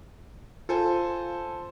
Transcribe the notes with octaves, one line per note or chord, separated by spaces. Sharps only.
F4 A4 C5 G#5